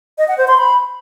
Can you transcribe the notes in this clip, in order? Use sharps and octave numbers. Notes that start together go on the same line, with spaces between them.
D#5
F#5
C5
C6
B5